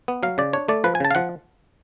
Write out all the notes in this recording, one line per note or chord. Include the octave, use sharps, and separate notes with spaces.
B3
F#3 F5
C#3 D5
D4 C#5
A3 D5
F3 B4
G#5
C#3 A5
F5
F3 F#5